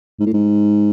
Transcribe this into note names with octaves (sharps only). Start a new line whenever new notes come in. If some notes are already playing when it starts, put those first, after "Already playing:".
G#2
A2
G#2